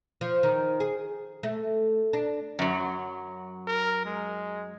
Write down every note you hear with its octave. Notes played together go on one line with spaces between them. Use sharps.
F3
D#3
G#4
A3
D4
F#2 F#3
A#4
G#3